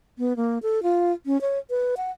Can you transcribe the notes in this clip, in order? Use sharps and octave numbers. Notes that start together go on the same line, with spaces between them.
B3
A#3
A4
F4
C#4
C#5
B4
F#5